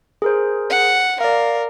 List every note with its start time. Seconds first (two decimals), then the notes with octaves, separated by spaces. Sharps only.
0.22 G#4 A#4 C5
0.70 F#5
1.21 A#4 D5 F5